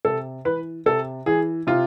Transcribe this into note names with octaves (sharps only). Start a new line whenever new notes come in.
C3 A4
E3 B4
C3 A4
E3 G#4
C3 F4